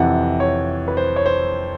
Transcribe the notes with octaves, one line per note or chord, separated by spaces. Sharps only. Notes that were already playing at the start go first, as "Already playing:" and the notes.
Already playing: F2 C3 E3 F#5
C#5
B4
C5
C#5
C5